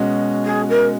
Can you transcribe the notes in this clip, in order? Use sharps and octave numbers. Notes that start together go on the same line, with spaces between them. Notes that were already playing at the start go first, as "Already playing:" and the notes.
Already playing: B2 G#3 C#4 F#4
G#4
A#4